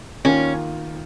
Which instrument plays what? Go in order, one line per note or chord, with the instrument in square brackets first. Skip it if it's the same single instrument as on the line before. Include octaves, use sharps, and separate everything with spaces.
[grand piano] D#3 A#3 F4 [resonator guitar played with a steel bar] C#4